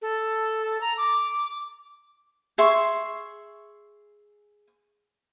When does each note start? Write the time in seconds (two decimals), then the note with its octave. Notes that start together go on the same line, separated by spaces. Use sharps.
0.02 A4
0.81 A#5
0.98 D6
2.58 G#4 E5 C6 C#6